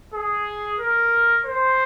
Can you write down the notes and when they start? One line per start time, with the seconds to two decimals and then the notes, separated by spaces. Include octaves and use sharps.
0.14 G#4
0.79 A#4
1.45 C5